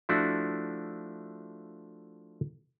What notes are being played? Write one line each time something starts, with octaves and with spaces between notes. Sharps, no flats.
F3 A3 D4 E4 F#4